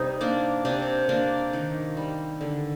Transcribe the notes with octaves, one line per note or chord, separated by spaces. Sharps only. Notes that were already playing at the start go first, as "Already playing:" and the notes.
Already playing: C3 G3 D#4
A#3 D4
C3 D4
A#3 D4
D#3
G3
D3